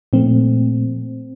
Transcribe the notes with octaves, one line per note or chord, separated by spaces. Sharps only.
A#2 F3 A3 C4